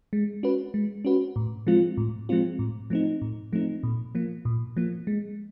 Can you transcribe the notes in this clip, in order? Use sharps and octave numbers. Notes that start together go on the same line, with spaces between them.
G#3
C#4 F#4 B4
G#3
C#4 F#4 B4
A2
F3 G#3 C4 F4
A2
F3 G#3 C4 F4
A2
F3 A3 C4 D#4
A2
F3 A3 C4 D#4
A#2
F3 A#3
A#2
F3 A#3
G#3